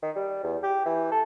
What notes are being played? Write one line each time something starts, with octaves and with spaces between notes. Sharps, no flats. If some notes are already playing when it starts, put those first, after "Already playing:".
D#3
G3
E2
G4
E3
A4